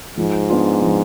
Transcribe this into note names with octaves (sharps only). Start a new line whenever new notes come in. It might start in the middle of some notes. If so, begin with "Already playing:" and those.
G#2 F3
B3 D4 F4
F3